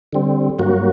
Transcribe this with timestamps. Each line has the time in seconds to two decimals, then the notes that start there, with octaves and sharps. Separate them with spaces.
0.13 D3 G3 C4
0.59 G2 F#3 A#3 F#4